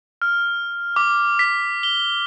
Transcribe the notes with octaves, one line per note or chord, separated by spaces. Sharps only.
F6
D6
B6
G7